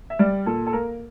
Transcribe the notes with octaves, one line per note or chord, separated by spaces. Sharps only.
E5
G3 D5
A#2 A4
A4
A#3 A#4